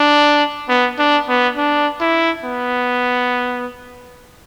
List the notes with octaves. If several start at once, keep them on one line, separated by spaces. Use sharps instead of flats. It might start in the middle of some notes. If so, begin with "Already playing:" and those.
Already playing: D4
B3
D4
B3
D4
E4
B3